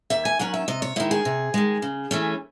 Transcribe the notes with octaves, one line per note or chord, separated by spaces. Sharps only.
D#2 E5
G#5
D#3 F#3 C#4 F#5
E5
C3 D#5
C#5
D#3 G#3 E4
G#4
C3
D#3 G#3
C#3
E3 A3 C#4